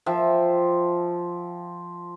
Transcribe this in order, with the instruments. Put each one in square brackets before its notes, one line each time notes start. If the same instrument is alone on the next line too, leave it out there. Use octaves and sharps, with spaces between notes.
[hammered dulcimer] F3 E5 G5